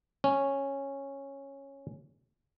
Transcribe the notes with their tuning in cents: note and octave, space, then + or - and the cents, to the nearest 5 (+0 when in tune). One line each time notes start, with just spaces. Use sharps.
C#4 -10